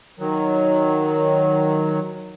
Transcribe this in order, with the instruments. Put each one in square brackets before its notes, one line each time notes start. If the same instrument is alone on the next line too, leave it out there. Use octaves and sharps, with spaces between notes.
[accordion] D#3 F#3